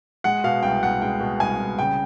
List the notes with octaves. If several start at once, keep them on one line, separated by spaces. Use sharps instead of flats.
G#3 F#5
B2 F5
C2 G5
C2 F#5
G#3 G5
B2
C2 G#5
C2
C#3 G5